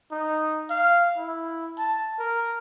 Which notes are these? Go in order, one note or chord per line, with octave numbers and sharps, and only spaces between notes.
D#4
F5
E4
A5
A#4